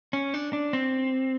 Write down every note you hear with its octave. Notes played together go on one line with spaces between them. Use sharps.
C#4
D4
D4
C4